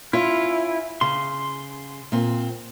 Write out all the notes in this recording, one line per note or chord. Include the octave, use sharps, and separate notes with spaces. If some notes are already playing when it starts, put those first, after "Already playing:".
C#4 E4 F4
C#3 C6
A#2 C4